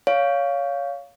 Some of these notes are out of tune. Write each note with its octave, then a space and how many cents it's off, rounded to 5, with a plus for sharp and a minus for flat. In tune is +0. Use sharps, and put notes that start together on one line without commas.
C#5 +20 F5 +0